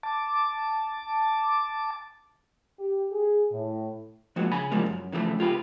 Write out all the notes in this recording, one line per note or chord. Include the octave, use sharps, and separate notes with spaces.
A5 D6
G4
G#4
A2
F3 G#3 A#3 F#4
C#3 G#5 B5
C#3 E3 F3 G3 G#3 A#3
F#2
C#3 E3 F3 G#3 A3
C#2 F4 G4 B4